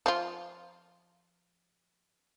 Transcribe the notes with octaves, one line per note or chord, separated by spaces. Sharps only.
F3 F4